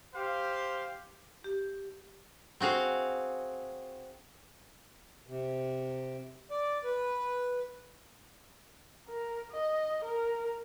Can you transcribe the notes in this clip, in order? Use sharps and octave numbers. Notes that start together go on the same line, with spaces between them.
G4 C5 F5
G4
C4 F#4 G#4 F5
C3
D5
B4
A#4
D#5
A#4